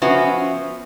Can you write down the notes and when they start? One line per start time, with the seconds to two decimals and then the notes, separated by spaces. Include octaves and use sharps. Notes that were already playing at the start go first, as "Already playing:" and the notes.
0.02 F3 B3 C#4 F#4 E5